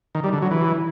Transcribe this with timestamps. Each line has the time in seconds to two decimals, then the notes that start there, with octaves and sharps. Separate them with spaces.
0.15 D#3
0.24 G3
0.33 D3
0.42 F#3
0.51 E3